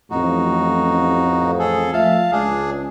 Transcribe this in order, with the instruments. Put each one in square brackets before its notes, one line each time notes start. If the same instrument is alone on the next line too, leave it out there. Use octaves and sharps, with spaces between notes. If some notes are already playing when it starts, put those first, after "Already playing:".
[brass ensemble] A1 F2 [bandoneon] D#4 F#4
[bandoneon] G#4 A4
[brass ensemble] F3 A3 E5 [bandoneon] F5 A5
[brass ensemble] C#2 [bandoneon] D4 G#4